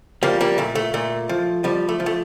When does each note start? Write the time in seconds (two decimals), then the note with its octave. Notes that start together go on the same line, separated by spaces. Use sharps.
0.23 F3 G3 A#3
0.41 G3 A#3
0.58 A#2 A3
0.75 A3
0.94 A#2 A3
1.29 F3
1.64 F3 G3
1.89 A3
2.00 F3
2.06 A3